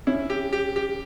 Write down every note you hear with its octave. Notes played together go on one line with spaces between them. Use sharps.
C#4 E4
G4
G4
G4